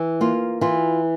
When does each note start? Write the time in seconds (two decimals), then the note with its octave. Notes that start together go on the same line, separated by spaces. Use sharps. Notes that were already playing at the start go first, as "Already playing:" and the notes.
Already playing: E3
0.21 A#3 F4
0.61 E3 F4